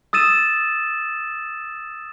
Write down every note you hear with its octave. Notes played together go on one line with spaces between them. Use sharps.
D#6 E6 A6 D#7 E7